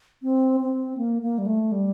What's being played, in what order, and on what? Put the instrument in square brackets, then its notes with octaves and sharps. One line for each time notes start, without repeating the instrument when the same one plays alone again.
[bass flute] C4
C4
A#3
A#3
G3
A3
G3